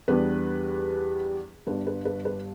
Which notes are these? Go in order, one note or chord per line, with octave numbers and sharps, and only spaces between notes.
E2 E3 G3 B3 D4 B4
G1 G2 G3 D4 B4
B4
B4
B4